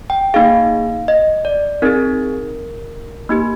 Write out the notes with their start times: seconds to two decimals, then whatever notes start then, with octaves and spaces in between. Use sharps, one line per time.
0.10 G5
0.34 A#3 D#4 G#4 F5
1.08 D#5
1.45 D5
1.82 C4 D#4 G#4 A#4
3.29 A#3 D#4 G4